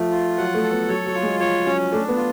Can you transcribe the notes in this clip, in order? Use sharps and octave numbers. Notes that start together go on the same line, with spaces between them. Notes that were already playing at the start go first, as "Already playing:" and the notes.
Already playing: F3 A3
F4
F#3 F#5
A3
A4
B3
F#3 C#5
F#3
F4
G#3
F3 C#5
F#3 C#4
A3 D4
B3
F4